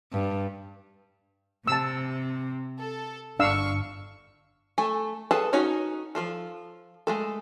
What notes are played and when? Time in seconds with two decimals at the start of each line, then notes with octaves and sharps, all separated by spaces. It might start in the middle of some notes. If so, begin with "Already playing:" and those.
0.13 G2
1.68 C3 A5 E6
2.79 A4
3.40 G1 D4 F5 C#6 E6
4.78 A3 A4 G#5
5.31 G#4 A4 B4 A5
5.53 C#4 D#4 F#4 C#5
6.15 F3 G#3 F4 A4
7.07 G#3 A3 A4